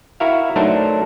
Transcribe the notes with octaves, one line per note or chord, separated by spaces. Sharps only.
E4 F#4 A#4 E5 F5
F#3 A3 D4 D#4 A#4 C5